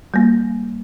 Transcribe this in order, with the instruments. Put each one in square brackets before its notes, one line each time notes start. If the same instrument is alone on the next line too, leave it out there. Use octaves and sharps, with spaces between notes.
[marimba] G3 A#3